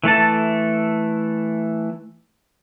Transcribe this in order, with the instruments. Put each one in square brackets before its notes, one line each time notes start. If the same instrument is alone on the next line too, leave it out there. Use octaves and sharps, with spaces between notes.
[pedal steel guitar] E3 A3 A4 A5